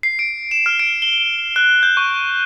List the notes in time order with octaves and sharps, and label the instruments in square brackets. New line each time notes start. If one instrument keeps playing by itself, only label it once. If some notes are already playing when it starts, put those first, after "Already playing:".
[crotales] C7
D7
E7
F6
D7
G7
F#6
G6
C#6